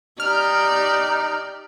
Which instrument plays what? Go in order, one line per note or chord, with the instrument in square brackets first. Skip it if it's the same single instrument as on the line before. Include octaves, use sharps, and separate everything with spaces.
[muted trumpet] D#4 [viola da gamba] G4 D5 [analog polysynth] F6